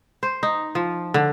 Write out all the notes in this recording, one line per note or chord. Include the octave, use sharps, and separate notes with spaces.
C5
D#4
F3
D3